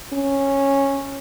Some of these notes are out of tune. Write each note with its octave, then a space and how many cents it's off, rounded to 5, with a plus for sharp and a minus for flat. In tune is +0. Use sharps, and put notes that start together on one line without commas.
C#4 -10